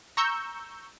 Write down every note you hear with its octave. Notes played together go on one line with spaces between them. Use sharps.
A#5 C#6 E6 G6